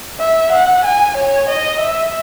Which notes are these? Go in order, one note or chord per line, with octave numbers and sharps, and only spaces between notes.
E5
F#5
G#5
C#5
D#5
E5